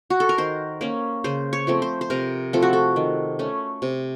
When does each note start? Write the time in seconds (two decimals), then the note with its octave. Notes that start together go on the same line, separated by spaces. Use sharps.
0.10 F#4
0.20 A4
0.29 A#4
0.38 D#3 C5
0.81 A#3 C#4
1.24 C#3 C5
1.53 C#5
1.67 F3 A3 C4
1.82 C5
2.01 C5
2.10 C3 A#4
2.53 F3 A3 C4 A4
2.62 F#4
2.73 A4
2.96 D#3
3.39 A3 C#4
3.82 C3